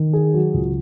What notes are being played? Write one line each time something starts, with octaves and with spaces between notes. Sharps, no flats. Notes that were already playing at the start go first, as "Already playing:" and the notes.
Already playing: D#3
G#4
F#3
C#2